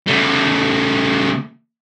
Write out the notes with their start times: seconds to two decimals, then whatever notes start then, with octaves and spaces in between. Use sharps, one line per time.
0.07 C#3 A3